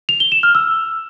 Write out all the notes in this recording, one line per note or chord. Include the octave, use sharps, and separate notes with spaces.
F7
G7
E7
F6
E6